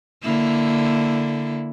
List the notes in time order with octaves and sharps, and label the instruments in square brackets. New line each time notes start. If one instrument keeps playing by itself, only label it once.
[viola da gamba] D3 A#3 E4